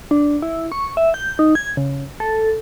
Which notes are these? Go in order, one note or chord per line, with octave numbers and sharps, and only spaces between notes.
D4
E4
C#6
E5
G6
D#4
G#6
C#3
A4